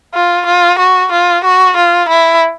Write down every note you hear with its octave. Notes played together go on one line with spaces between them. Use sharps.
F4
F4
F#4
F4
F#4
F4
E4